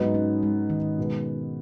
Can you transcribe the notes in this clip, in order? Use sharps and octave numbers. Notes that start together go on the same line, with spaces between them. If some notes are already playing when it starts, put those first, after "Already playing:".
Already playing: G#2 F#3 B3 D#4
C#4
G#3
D#3
B2 G#3 B3